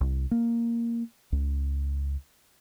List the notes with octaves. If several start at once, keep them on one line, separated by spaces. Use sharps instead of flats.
C2
A#3
C#2